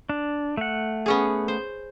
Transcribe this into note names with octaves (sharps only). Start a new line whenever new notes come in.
D4
A3 F#5
B3 C#4 G#4
C5